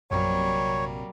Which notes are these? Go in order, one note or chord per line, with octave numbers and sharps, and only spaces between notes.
A#1 F#2 C3 F#3 G3 A#3 C#5